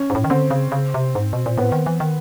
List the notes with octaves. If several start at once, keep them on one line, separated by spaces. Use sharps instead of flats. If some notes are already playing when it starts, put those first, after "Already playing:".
Already playing: C#4
G#2
A2
D#3
D3 C4
C#3
C#3
C3
G#2
B2
A#2
A2 B3
D#3
E3
D#3